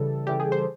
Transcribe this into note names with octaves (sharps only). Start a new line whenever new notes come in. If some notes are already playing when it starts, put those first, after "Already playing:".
Already playing: C#3 E3 G3 A4
C#3 E3 G3 G4
G#4
C5